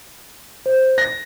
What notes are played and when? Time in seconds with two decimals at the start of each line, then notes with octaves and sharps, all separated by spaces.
0.66 C5
0.98 F#6 A#6